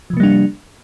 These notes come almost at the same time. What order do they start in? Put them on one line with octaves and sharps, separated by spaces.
F3 C3 A#3 G3 D4